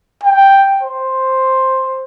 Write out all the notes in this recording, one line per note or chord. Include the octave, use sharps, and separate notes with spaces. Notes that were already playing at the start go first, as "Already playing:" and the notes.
G5
C5